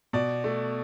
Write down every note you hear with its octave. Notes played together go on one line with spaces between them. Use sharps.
B2 D5
A3